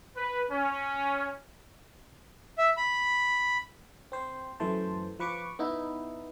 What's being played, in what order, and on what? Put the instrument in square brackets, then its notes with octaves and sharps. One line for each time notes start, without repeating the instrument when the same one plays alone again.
[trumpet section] B4
C#4
[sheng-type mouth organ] E5
B5
[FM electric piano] C4 C5
F#2 E3 A3 C5 A5
F3 B4 C#6 D6
B3 D#4 E4